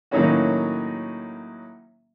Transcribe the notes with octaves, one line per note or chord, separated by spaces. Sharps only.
A2 D#3 F#3 A#3 C#4 F#4